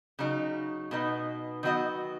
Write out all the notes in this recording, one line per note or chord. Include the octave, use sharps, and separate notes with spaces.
C#3 F#3 D#4
B2 B3 D#4 B4 D#5
D#3 F#3 B3 F#4 D#5